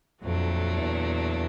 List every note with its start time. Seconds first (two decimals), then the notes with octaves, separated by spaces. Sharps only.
0.22 F2 A#2 F#3 A3 D4
0.77 E2